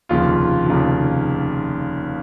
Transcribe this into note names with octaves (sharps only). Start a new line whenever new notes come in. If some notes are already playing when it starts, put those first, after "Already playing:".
F1 D#2 C#3 F3 F4
F1 D#2 C#3 F3